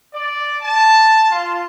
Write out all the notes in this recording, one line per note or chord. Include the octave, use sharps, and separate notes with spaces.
D5
A5
F4